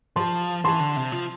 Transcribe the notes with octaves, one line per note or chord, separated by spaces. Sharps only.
F3 A5 C6
E3 A5 C6
D3
C3
F3